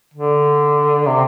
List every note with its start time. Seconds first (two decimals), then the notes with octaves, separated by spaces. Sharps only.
0.14 D3
1.07 C3